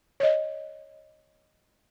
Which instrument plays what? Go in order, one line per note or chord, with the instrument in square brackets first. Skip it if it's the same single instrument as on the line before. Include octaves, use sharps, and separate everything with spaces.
[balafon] C#5 D#5